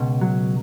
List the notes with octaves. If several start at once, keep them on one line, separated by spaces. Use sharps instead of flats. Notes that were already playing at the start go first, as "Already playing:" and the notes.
Already playing: C#2 B2
F#3